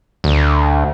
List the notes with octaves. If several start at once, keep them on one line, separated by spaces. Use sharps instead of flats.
D2